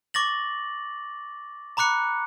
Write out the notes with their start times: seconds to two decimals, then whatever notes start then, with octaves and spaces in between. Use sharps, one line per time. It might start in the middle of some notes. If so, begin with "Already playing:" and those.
0.14 C#6 D6 A6 A#6 F#7
1.77 A#5 B5 D6 F#6 C#7